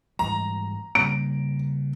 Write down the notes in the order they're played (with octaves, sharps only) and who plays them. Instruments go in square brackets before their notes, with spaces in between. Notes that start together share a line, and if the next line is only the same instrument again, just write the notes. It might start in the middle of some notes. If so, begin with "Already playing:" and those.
[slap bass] G#2 E3 G3 [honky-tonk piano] A#5
[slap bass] C#3 G3 A#3 [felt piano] D7